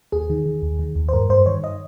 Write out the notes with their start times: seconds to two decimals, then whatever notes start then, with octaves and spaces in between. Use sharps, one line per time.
0.12 D#2 G#4
0.30 D#3
0.46 D#3
0.62 D#2
0.79 D#3
0.96 D#2
1.09 C5
1.13 G2 A#4
1.29 G2 C5
1.46 D#3 C#5
1.64 D#5